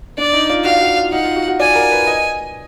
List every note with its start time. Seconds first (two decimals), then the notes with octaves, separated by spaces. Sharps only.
0.18 D4 D5
0.33 D#4
0.49 F4
0.65 F#4 F5
0.81 F#4
0.97 F4
1.12 D#4 F#5
1.24 F4
1.36 F#4
1.48 F#4
1.60 D5 G#5
1.75 A#4
1.91 B4
2.07 D#5